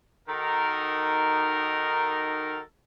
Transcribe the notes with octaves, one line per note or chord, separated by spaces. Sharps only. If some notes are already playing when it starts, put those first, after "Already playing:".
D#3 D#4 F#4 A4 A#4